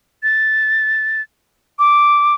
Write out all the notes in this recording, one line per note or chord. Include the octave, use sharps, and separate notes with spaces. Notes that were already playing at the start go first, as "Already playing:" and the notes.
A6
D6